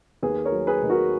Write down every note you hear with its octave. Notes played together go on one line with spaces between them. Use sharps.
D#2 G#4 B4
A#4 C#5
F#3
G#4 B4
D#3
F#4 A#4